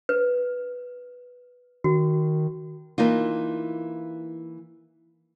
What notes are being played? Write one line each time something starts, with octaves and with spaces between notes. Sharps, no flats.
B4
D#3 F#4
E3 A#3 D#4 F4